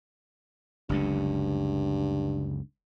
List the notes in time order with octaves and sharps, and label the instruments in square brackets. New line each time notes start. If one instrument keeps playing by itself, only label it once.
[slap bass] F#1 C#2 D3 [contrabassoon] G2